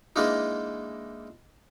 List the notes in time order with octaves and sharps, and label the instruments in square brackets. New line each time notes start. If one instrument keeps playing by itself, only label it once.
[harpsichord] E3 G#3 A#3 D4 D#4